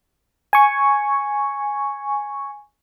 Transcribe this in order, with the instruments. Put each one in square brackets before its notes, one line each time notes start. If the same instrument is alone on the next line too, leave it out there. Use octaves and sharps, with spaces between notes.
[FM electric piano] G#5 C#6